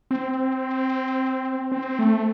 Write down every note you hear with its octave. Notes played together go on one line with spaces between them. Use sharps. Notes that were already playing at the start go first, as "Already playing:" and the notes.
C4
C4
A3